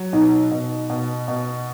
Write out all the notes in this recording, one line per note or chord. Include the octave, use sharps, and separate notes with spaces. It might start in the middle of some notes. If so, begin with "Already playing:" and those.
Already playing: F#3
B2 D#4
B2
B2
B2